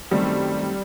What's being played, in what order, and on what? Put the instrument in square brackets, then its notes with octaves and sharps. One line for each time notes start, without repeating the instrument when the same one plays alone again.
[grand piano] F#2 D#3 A3 C4 [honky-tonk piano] G3